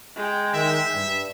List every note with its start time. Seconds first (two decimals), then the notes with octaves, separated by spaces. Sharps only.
0.16 G#3 G5
0.54 D#3 E5
0.94 G2